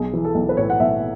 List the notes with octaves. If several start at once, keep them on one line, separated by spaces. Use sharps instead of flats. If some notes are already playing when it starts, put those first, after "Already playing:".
Already playing: B1 G#4
E3
A4
B1
B4
A2 C#5
F#5
B1 E5